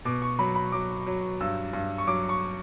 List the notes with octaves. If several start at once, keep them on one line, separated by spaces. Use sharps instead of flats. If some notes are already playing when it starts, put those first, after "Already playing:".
B2 D6
C#6
F#3 B5
B5
F#3 D6
F#3
G2 E6
G2
C#6
F#3 D6
C#6